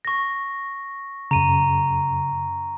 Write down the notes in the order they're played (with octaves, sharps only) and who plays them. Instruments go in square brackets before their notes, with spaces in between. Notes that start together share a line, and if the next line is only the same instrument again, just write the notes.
[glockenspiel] C#6 A#6
[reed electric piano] F#2 C#3 [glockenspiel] A#5 D#7